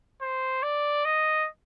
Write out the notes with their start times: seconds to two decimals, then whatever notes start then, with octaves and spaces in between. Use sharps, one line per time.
0.22 C5
0.63 D5
1.05 D#5